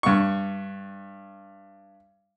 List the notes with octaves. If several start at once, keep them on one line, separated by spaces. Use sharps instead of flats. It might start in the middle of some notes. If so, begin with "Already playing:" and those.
G2 C#6